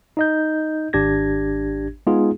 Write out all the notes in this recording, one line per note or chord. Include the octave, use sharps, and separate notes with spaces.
D#4 D#5 G6
G#1 D4 G4 G#6 A#6
G#3 B3 D#4 F4 G#4